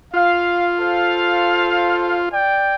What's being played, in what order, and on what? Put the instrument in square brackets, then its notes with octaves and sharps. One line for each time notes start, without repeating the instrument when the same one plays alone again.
[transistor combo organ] F4 [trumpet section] F5
[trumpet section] A4 C5 F5
D5 G5